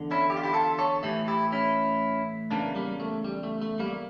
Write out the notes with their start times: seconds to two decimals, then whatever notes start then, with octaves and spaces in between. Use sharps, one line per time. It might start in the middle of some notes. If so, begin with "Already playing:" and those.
Already playing: E2 D3
0.11 C#4 E4
0.30 G4
0.37 F4
0.43 E4 G4
0.54 F4 A4
0.79 A4 C#5
1.03 A2 E3 E4 G4
1.28 E4 G4
1.52 C#4 E4
2.51 E2 C#3 E3 A#3 D4
2.75 G3 A#3
3.00 A3
3.24 G3
3.43 A3
3.62 A3
3.79 G3 A#3